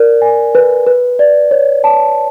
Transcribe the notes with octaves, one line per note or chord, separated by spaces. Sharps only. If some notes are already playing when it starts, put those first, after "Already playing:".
Already playing: A#4 D5
G#5
B4
B4
D5
C#5
A5